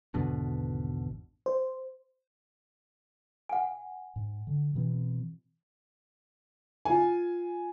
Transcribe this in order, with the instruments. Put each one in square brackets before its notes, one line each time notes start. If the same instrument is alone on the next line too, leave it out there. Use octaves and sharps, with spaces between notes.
[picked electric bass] G#1 E2 B2 D3
[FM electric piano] C5
[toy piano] F#5 G#5
[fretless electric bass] G#2
D3
B2 E3 C4
[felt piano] F4 G#5